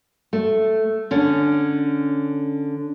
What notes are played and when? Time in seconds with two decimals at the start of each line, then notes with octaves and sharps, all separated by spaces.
0.33 A3
1.11 D3 C#4